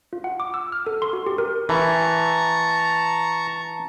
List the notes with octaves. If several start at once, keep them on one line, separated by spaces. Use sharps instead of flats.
F4
F#5
D6
E6
F6
A4
C6
F#4
G4
A#4
E3 A5 A#5 C#6